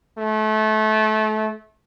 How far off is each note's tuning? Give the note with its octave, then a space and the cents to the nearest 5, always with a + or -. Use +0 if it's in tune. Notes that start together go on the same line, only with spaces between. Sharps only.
A3 -25